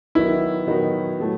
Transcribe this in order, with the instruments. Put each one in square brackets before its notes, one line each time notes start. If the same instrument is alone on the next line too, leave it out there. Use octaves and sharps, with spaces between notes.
[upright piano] D#3 F#3 B3 D#4 [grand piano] E4
[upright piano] D#3 F#3 B3 D#4
A2 F#3 A3